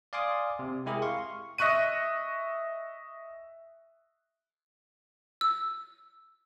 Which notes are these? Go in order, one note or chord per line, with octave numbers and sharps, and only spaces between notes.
D5 F5 G#5 C6 D6 D#6
C3
G#3 E4 G4 G#4 A#4
F5 C6 C#6
D#5 E5 C#6 F#6 D#7
E6